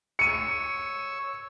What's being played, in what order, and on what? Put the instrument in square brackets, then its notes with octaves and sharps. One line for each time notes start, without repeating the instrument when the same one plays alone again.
[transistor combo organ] C#5 E6 [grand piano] C#7 D#7